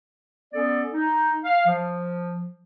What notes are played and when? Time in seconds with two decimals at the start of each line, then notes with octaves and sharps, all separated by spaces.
0.53 B3 C#4 A4 D5
0.93 D#4
1.44 F5
1.66 F3